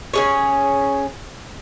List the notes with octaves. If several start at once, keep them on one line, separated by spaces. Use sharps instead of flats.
C#4 G#4 C#5